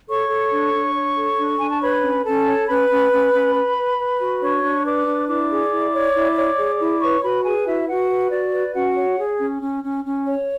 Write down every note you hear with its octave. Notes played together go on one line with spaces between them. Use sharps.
A4 C#5 C#6
A4
D4
D4
C#5
A4
D4
D4 G#5
A5
B4 C#5 B5
C#4
C#4 A4 A5
C#5
C#4 B4 B5
C#4
C#4
C#4
B4
B4
B4
F#4
D4 C#5 C#6
D4
B4 D5 D6
D4
E4 D5 D6
G#4
E4
C#5
E4
C#5
G#4
E4
B4 C#5 C#6
F#4 B4 B5
G#4 B4 G#5
E4 F#4 E5
F#4 B4 F#5
B4
F#4 D5
B4
C#4 F#4 F#5
C#5
G#4
C#4
C#4
C#4
C#4
C#5